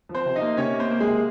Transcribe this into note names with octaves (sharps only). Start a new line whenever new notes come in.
F3
C4 C5
C3
D#4 D#5
A#3
C3 C#4 C#5
A#3
C4 C5
A#3
G#3 G#4
C3